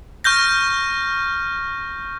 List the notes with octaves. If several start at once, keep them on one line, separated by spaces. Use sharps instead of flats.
C#6 F6 G6 A#6